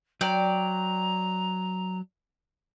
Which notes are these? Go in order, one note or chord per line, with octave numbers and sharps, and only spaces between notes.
F#3 D5 G5 A#5